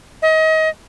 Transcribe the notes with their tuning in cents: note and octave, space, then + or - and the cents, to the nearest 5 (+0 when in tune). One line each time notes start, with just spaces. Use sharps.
D#5 +30